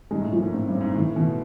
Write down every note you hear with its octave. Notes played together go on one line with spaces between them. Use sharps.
G#2 G#3
A2
A#2 F3
G#2
A2 C4
G2
C4
G#2
A2 E3
B2 E3